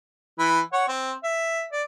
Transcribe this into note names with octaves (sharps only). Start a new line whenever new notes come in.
E3 B5
C#5 F#5
C4
E5
D5